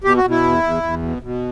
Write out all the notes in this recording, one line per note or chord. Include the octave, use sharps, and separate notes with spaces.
B2 G4
F#4
B2
E4
E2
E2
E2
B2
B2